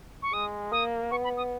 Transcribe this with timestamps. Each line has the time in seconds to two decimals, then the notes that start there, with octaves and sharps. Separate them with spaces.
0.22 C#6
0.33 G#3 D#6
0.72 A#3 D#6
1.11 B3 C#6
1.24 B5
1.37 D#6